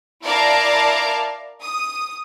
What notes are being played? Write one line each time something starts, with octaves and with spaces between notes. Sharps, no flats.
E4 A#4 D5 F5 A5 A#5
D#6